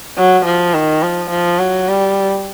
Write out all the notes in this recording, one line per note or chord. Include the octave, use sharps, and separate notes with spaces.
F#3
F3
D#3
F3
F3
F#3
G3